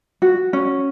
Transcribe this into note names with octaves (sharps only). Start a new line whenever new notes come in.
F#4
C#4